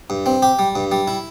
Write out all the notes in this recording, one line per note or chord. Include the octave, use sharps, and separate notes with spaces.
G2
C4
G4
G3
G2
G3
E4